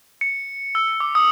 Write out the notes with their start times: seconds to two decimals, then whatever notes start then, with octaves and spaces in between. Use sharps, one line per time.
0.21 C#7
0.75 E6
1.00 D6
1.15 D#6